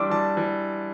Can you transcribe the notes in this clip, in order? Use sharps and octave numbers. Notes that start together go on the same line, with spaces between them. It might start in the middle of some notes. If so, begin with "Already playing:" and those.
Already playing: E3 G3 D4 C6 D6 E6
E3 A5
E3